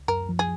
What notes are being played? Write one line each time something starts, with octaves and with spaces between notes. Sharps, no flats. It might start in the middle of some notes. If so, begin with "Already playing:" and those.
Already playing: C#2
F#2 A#4
F3
G#4